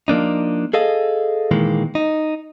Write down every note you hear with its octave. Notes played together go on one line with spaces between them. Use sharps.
F3 A#3 D4 D#4
G#4 A4 D#5 F5
A#2 D#3 E3 G#3 A#3
D#4